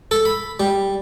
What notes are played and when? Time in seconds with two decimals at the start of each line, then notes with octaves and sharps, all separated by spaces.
0.11 A4
0.25 B5
0.60 G3